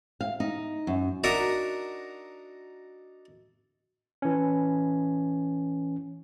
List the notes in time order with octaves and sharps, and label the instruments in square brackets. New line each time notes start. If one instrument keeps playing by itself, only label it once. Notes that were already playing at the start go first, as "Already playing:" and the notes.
[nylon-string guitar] F5
D#4
F#2
[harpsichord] D4 D#4 F#4 A#4 E5 A#5
[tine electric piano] E3 C#4